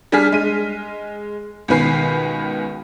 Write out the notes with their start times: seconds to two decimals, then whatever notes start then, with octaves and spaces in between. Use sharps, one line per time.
0.12 G3 D4 G#4 G#5 F6 B6
0.32 G#3 D#7
1.68 C#2 B2 D#3 B4 G#5 C7